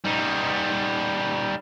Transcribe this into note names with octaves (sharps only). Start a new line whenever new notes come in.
G3 D#4